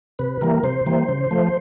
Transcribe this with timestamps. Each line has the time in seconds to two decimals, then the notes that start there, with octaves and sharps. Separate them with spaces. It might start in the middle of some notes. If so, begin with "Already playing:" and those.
0.19 C3 B4
0.41 E3 G3 A#3 A#4
0.63 C3 C5
0.86 E3 G3 A#3
1.09 C#3
1.31 F3 A3